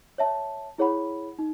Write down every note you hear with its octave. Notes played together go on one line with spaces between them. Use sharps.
C#5 E5 A5
E4 G#4 C#5 F#5 B5
D#4